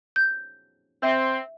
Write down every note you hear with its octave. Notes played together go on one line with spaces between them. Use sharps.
G6
C4 E5